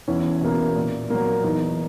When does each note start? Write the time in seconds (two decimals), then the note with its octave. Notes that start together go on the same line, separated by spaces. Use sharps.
0.08 E2 C#4 E4
0.41 B2 A#3
0.76 A#2
1.10 F#3 A#3
1.44 E2 D#4